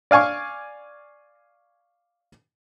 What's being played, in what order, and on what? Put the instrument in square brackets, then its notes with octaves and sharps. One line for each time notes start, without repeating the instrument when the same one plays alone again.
[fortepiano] D5 F5 G#5 C#6